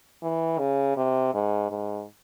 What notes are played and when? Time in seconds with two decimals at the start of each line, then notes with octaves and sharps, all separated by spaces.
0.23 E3
0.59 C#3
0.97 C3
1.34 G#2
1.70 G#2